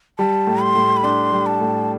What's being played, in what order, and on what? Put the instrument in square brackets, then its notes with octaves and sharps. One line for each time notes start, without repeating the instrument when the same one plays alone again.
[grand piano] G3 [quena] A5
[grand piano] A2
[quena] C6
[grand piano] A2
[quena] B5
[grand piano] D4 [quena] C6
[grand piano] G3
[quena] A5
[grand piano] A2